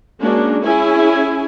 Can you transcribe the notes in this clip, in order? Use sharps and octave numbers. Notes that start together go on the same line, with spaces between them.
G#3 A#3 C#4 D4 F#4
C#4 E4 G#4 G#5